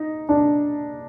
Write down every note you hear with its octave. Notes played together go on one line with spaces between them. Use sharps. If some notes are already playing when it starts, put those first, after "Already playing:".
Already playing: D#4
D4